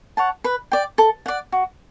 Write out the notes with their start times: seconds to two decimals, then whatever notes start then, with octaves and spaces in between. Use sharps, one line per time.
0.17 C#5 F#5 A5
0.44 B4
0.72 D5 G5
0.98 A4
1.26 D5 F#5
1.52 F#4